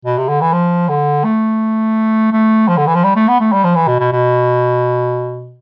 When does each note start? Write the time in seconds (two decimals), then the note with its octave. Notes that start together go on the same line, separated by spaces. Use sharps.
0.05 B2
0.17 C3
0.28 D3
0.41 E3
0.52 F3
0.89 D3
1.24 A3
2.32 A3
2.68 F3
2.77 D3
2.87 E3
2.95 F3
3.03 G3
3.16 A3
3.28 B3
3.40 A3
3.52 G3
3.64 F3
3.75 E3
3.87 B2
3.99 B2
4.12 B2